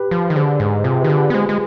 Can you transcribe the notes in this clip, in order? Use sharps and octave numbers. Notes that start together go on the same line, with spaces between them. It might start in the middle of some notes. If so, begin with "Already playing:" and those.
Already playing: G4 B4
F3
D#3
D3 G#4 C5
G#2
C3 F4 G#4
D#3 G4 B4
D3
G4 B4
B3
G#3 G#4 C5
G#3